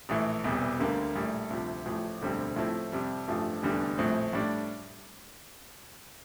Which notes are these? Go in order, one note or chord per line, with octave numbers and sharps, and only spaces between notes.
A#1 A2 E3
E1 E2 C3 G3
D2 D3 G3 A#3
A#1 A2 G3
D2 C3 F3
A1 A2 F3
E1 D2 D3 G3 C4
A2 F3 A3 C4 E4
F2 C3 G3
A1 G2 F3 A3
F1 E2 D3 G3
A#1 A2 F3 C4
A2 G3 D4